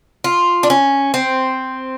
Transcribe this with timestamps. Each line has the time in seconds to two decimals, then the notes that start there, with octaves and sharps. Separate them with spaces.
0.24 F4
0.63 D4
0.70 C#4
1.14 C4